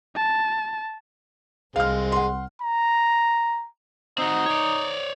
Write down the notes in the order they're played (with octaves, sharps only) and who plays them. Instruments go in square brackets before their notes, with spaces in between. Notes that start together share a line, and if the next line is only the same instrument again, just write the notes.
[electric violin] A5
[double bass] C2 [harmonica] G#3 C4 G#4 [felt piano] F5 F6
[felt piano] F#5 C6
[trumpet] A#5
[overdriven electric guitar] C4 F#4 [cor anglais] D#4
[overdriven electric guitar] C#5 D5